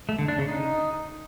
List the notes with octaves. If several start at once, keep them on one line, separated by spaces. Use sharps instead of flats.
A3
D3
D4
C#3
D#4